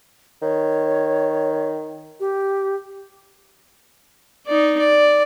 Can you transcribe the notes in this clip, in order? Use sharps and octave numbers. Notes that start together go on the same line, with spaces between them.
D#3 C#5
G4
D#4 D5
D5